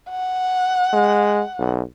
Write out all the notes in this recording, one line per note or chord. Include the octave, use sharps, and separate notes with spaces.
F#5
G#3
B1